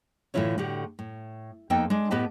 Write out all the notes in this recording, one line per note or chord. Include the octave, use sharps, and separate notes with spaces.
A2 D3 E3 E4 F4 C#5
A2 D3 F#4 G4
A2
F2 A#3 B3 D#4 A4 G5
G#3 D4
A2 B3 G4 B4 D#5 A5